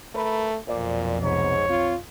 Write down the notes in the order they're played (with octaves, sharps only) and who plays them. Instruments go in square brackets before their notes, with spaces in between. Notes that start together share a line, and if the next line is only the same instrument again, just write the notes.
[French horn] A3 [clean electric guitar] A#4 B4
[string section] B1 F2 [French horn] A#2 [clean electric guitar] C5 D5
[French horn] G#2 [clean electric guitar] C3 B3 [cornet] C#5
[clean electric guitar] C4 [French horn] F4